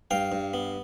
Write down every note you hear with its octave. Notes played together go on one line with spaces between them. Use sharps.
G2 F5 G5
G2
B3